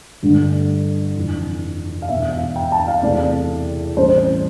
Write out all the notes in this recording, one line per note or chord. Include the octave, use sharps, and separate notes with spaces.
G1 G2 D3 A3
F1 F2 C3 E3
F5
E2 B2 B3 E5
F5
G5
A5
F5
E2 C3 E3 A3 C4 D5
A1 A2 G3 C4 C5